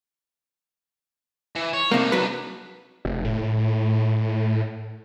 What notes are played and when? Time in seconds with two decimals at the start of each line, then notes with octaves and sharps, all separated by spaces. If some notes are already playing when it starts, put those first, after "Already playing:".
1.55 E3
1.73 C#5
1.91 C3 A#3 D4 D#4
2.12 F#3 B4
3.05 F1
3.25 A2